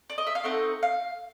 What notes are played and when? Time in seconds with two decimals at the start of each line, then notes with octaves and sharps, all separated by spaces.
0.10 D5
0.18 D#5
0.27 E5
0.35 F5
0.44 A3 C4 D#4 F#5
0.83 F5